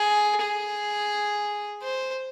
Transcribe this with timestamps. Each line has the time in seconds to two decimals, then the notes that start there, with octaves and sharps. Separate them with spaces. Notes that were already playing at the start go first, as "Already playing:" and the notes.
Already playing: G#4
0.41 G#4
1.82 C5